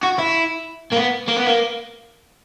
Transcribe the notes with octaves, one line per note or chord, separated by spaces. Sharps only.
F#4
E4
A#3
B3
A#3
B3
A#3